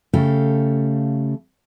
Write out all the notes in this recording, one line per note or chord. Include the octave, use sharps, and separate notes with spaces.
C#3 A3 G4 A4 F5